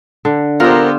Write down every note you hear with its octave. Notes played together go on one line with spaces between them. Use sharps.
D3
B3 F4 G4 A#4 C5 E6